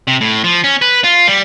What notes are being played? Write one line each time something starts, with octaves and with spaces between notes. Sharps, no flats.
C3
A2
F3
C#4
B4
F4
G3